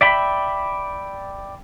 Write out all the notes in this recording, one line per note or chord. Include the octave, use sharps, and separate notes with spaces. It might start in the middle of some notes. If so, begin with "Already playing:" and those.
D5 E5 G5 B5